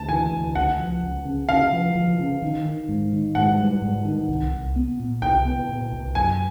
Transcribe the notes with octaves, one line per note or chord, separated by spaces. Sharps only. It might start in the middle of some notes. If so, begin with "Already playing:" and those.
Already playing: D2 A5
E3 G#5
D2
C#2 F#5
F3
C#2
C#3
C#3 F5
F3
F3
C#3
D#3
D#3
G#2
D#3
G#2 F#5
G3
G#2
D#3
C2
C2
B3
A#2
C2 G5
B3
A#2
C2
F#2 G#5